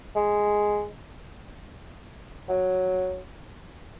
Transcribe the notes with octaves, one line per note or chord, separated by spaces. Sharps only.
G#3
F#3